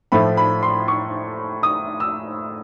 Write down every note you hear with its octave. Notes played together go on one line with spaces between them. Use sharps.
A2 F3 A3 B5
B5
C6
C#6
D#6
E6